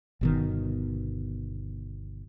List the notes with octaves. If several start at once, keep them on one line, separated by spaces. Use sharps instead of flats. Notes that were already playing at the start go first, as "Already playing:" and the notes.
G1 B2 D#3